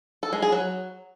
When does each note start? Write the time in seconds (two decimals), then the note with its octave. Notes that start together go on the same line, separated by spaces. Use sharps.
0.23 A4
0.33 G#3
0.42 G#4
0.52 F#3